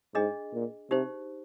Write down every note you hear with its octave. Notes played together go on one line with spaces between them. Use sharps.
G#2 D4 G#4 D#5
A#2
C3 D#4 G4 C5